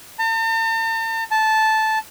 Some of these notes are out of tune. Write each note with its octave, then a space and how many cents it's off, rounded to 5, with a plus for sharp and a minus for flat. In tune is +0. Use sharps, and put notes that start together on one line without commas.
A5 +45
A5 -10